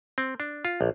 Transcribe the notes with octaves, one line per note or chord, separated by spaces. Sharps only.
C4
D4
F4
A#1